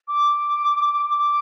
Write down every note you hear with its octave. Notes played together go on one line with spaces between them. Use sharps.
D6
D6